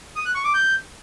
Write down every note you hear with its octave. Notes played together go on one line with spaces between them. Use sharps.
D#6
F#6
C#6
D6
G6